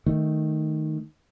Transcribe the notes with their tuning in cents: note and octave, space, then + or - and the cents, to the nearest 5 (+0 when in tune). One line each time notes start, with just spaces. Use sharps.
D#3 +0 A3 +0